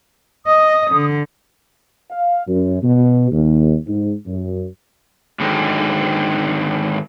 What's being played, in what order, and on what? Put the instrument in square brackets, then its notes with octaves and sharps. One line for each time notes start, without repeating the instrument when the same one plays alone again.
[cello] D#5 [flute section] D#6
[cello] D3
[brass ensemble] F5
F#2
B2
D#2
G#2
F#2
[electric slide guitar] G#2 D3 D#3 F#3